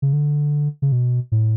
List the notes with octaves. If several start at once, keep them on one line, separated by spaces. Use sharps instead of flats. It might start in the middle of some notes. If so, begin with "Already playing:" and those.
C#3
D3
C#3
B2
A2